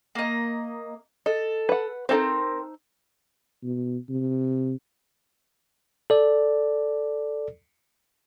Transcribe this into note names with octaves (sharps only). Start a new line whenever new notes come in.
A#3 D#5
A4 D#5
B4 F#5
C4 D#4 A4 A#4 C5
B2
C3
A4 D5